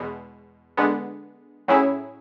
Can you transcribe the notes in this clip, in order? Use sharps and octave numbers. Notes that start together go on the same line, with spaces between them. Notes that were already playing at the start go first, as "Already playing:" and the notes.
Already playing: E2 B2 G#3
D3 G#3 B3
A2 F#3 C#4 E4 G#4